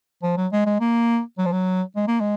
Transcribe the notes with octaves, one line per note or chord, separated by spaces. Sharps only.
F3
F#3
G#3
G#3
A#3
F#3
F3
F#3
G#3
A#3
G#3